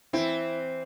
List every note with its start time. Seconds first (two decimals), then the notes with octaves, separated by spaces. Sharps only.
0.13 E3 C4 E4